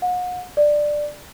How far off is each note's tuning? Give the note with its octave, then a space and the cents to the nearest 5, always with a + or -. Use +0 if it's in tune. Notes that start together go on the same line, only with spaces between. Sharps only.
F#5 -40
D5 +10